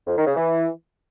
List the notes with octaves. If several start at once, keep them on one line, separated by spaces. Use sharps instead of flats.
F2
D#3
C#3
E3